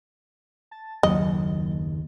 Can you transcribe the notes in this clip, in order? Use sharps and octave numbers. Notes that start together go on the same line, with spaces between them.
A5 A6
F#1 D#2 F#3 D#5